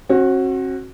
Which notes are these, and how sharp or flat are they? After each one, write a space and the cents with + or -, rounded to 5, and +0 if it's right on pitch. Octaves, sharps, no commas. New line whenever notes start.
C4 +45 F#4 +0